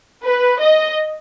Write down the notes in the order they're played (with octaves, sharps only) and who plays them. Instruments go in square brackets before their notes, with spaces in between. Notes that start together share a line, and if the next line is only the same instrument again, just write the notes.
[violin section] B4
D#5